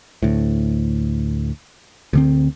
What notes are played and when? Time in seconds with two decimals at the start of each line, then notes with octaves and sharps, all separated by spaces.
0.23 D2 A2
2.13 D2 D3 C4